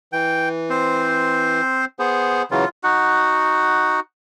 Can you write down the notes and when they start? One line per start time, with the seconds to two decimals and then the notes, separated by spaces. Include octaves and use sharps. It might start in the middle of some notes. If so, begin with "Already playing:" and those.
0.13 E3 G5
0.70 C4 C5
1.99 B3 G#4 C5
2.51 C#3 E3 F#3 F4
2.84 D#4 F#4 F#5